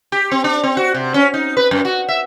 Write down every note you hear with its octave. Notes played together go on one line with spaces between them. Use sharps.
G4
C4
D4
C4
F#4
C3
C#4
D#4
B4
F#2
F#4
E5